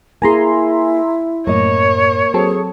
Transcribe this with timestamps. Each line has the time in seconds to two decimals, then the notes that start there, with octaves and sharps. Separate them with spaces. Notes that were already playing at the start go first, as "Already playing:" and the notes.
0.22 A#3 E4 G#4 G#5 A#5 C6
1.47 F#2 A2 A#3 C#5 D#5
2.34 F#3 C4 G#4 A4